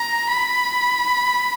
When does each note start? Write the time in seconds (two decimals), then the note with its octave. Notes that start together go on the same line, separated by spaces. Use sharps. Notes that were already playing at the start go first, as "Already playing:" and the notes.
Already playing: A#5
0.29 B5